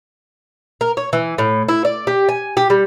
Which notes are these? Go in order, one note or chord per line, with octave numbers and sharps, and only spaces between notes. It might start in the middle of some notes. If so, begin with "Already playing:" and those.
A#4
C#5
E3
A2
E4
D5
G4
G#5
G4
G3